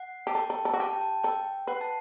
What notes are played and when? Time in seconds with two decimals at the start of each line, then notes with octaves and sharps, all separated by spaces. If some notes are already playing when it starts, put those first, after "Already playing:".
Already playing: F#5
0.27 G4 A5
0.35 A4 G5
0.50 A4
0.65 A4
0.73 F#4
0.80 G4 A5
0.93 G5
1.01 A5
1.23 A4 G5
1.67 B4 F#5
1.81 A5